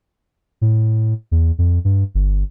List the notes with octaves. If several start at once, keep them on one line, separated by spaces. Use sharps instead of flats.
A2
E2
F2
G2
G1